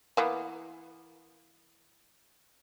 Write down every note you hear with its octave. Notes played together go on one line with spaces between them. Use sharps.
E3 A#3 B3